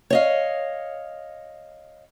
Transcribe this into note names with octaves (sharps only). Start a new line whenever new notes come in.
C#5 D#5 F5